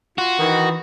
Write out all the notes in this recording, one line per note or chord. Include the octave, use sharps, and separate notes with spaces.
F4 F#4
D#3 E3